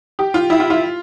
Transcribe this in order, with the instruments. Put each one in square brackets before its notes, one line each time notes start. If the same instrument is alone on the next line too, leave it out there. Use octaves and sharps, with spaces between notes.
[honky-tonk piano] G4
F4
E4
F4
F4